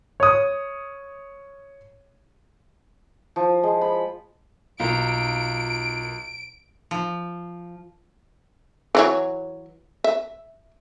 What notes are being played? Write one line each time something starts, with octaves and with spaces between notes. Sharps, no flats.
C#5 D#6
F3
G#3
B5
B1 F4 A#4 D7
F3
E3 F#3 C#5
E5